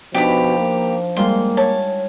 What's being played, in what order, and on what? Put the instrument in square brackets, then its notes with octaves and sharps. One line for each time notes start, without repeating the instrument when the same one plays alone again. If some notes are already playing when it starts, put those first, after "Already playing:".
[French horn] B2 [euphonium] F3 [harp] D4 D#4 [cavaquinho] G4 B5
[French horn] A#3
[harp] G3 G#3 F4 [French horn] A#3 [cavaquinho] C6
[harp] C#5 [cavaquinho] A5